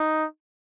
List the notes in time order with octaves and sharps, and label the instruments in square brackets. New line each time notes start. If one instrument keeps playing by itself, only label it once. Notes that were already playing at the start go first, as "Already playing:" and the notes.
Already playing: [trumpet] D#4